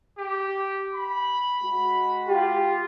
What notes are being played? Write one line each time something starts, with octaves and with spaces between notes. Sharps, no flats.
G4
B5
G#3 F#4
F4 G4